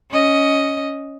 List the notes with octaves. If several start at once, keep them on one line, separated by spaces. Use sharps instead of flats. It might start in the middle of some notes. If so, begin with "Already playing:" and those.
C#4 D#5